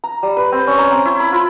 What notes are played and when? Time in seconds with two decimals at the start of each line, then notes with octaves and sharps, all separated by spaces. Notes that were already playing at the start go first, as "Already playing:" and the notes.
0.04 A#5
0.23 G3
0.37 B4
0.52 C4
0.67 C#4
0.78 A#5
0.91 C4
1.06 E4
1.20 B5
1.32 F4